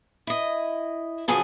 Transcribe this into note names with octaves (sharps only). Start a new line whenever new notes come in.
E4 D#5
C#3 F3 F#3 G#4 A4